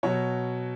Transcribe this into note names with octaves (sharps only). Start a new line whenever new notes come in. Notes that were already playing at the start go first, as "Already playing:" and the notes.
B2 F#3 C#5